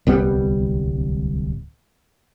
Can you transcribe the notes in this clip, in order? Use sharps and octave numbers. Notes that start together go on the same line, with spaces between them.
D1 C2 G3 B3